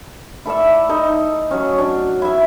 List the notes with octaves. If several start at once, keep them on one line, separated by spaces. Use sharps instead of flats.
E4 A4 D5 E5
D#4 A4
F#3 C#4
D4
E4 E5